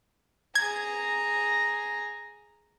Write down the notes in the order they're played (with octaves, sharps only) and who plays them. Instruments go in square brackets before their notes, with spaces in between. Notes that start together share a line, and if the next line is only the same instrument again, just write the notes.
[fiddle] G#4 A#5 [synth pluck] G#6